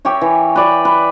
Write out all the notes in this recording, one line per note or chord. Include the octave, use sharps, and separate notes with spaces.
G4 A#4 C#5 E5
E3
B4 D5 G5
B4